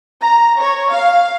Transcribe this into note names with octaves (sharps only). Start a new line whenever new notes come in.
A#5
C#5
F5